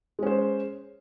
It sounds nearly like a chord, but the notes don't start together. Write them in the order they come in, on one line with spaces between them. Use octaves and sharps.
G#3 C#4 C5